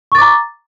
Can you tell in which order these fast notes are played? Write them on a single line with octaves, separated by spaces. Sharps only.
C#6 A6 D6 A#5